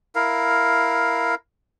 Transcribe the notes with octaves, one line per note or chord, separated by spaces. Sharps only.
E4 A#4 F5